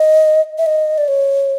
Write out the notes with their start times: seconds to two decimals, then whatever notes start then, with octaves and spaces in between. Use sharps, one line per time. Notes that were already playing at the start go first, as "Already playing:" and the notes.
Already playing: D#5
0.58 E5
0.66 D#5
0.98 D5
1.08 C#5